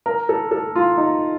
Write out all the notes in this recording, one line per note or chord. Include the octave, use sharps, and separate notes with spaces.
A#4
A4
A4
F4
D#4